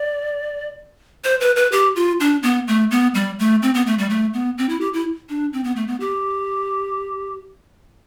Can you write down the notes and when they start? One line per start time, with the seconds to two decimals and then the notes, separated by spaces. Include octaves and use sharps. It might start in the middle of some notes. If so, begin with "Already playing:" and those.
Already playing: D5
1.24 C5
1.41 B4
1.56 B4
1.72 G4
1.96 F4
2.20 D4
2.43 B3
2.68 A3
2.91 B3
3.14 G3
3.39 A3
3.62 C4
3.74 B3
3.87 A3
3.98 G3
4.10 A3
4.34 B3
4.58 C4
4.69 E4
4.81 G4
4.93 E4
5.29 D4
5.53 C4
5.64 B3
5.76 A3
5.88 B3
6.00 G4